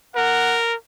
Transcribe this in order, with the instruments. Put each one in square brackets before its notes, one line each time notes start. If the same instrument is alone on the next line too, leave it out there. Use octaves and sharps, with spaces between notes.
[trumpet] A#4 [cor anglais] F#5